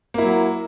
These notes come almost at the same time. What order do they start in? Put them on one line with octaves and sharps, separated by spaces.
A#3 E4 F#3